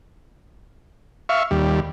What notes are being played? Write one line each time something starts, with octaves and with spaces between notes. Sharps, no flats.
E5 F5 C#6
D#2 G3